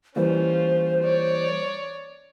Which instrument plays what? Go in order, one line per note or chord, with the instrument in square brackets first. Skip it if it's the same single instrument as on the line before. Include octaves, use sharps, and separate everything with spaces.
[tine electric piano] E3 G3 A#3 [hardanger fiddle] C#4 F4 [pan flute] C5
[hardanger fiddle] C#5 D5